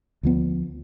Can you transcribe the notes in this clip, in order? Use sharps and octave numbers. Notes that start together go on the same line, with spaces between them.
D2 F3 B3